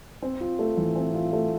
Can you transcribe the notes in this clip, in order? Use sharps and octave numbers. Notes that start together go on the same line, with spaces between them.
C4
F4
A3
E3
C4
F4
A3